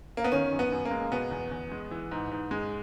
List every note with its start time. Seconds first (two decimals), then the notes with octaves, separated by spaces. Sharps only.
0.17 A#3
0.24 B3
0.32 D#3 C#4
0.52 F#2
0.59 B3
0.72 F#2
0.85 A#3
0.91 G#3
1.11 B2 B3
1.31 E2
1.51 E2
1.72 G#3
1.91 E3
2.11 G#2
2.31 G#2
2.51 G#3